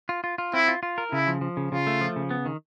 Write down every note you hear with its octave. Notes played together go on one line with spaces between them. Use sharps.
F4
F4
F4
C4 E4
F4
F4
A#4
C#3 E4
F3
F3
C#3
C#3 F4
A3
F3
C#3
B3
D#3